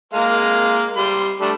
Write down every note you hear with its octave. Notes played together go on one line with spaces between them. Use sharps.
G#3 A#3 F5
G3 C6
G3 A3 D4